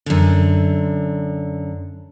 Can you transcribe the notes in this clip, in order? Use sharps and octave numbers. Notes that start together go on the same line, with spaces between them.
F#2 D3